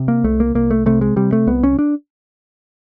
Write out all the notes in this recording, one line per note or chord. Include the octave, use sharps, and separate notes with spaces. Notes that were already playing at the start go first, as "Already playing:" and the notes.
Already playing: C3
A#3
C2 A3
A#3
C2 A#3
A3
C3 A3
G#3
C3 G3
A3
C2 B3
C#4
D4